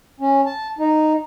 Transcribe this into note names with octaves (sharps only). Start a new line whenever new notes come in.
C#4
A5
D#4